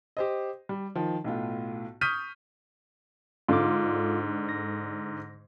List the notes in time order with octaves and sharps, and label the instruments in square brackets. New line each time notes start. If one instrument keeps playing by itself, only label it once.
[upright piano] G4 C5 D#5
G3
D#3 F3
B1 A2 F4
C#6 D#6 F6 G6 B6 D#7
[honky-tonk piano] G#2 D3 [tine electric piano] F4 D6
[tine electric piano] A#6